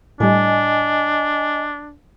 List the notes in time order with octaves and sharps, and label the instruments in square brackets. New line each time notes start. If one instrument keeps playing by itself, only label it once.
[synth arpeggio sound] A2 G3 [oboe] D4 [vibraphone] D#5 G#5